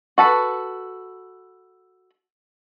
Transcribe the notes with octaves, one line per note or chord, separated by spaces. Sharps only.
F#4 A4 B4